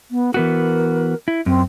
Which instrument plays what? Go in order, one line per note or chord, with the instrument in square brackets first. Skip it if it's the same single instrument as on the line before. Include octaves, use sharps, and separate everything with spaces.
[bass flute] B3
[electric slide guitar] E3 B3 F#4 [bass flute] A#4
[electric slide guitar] E4
[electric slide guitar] F#2 [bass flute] C4